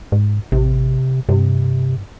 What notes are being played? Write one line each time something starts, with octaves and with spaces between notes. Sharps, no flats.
G#2
A1 C3
G2 C3